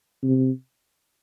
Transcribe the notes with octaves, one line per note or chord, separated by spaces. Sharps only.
C3